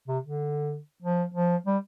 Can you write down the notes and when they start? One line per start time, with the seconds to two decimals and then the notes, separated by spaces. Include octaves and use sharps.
0.08 C3
0.23 D3
1.02 F3
1.34 F3
1.66 G3